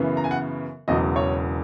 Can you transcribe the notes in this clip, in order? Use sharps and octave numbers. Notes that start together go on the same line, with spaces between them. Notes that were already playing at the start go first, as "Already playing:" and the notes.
Already playing: F#2 C#3 E3 B3
A#5
G#5
F#5
E1 E2 C#3 F#3 D#5
C#5